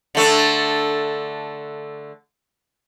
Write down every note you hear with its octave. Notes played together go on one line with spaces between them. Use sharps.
D3 A3 D4